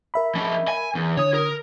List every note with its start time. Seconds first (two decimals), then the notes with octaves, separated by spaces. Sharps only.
0.14 A#4 E5 B5
0.35 F3 C#4
0.68 G#5
0.95 E2
1.17 D3 C#5 D#6
1.34 A#4